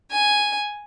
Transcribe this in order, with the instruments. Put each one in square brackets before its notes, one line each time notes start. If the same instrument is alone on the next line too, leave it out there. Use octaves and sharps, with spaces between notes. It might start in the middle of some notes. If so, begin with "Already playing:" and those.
[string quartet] G#5